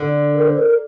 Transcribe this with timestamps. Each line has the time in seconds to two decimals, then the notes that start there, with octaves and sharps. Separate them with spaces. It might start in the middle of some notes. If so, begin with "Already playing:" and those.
Already playing: D3
0.35 A#4
0.47 C5
0.58 A#4